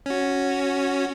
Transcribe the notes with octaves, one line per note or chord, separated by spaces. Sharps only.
C#4 F#4